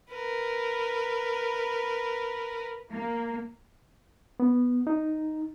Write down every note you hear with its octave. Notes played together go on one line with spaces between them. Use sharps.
A#4 B4
A#3
B3
D#4